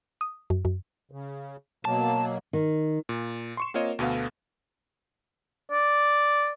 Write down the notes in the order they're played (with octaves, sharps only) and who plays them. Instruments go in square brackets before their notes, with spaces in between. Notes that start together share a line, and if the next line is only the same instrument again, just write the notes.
[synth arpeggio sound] D#6
F#2
F#2
[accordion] C#3
[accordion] B2 F#3 A#3 [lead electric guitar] A5
[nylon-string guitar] D#3
[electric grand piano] A#2
C6 C#6 E7
A#3 C4 F4 A#4 C#5 D#5
D2 B2 B3 A4 F5
[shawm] D5